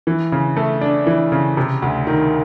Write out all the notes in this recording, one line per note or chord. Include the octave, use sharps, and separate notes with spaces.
E3
C#3
A3
D4
E3
C#3
C3
D2
D#3